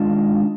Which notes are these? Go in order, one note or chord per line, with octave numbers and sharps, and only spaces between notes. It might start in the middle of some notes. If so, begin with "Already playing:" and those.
Already playing: D#3 G#3 D4 F4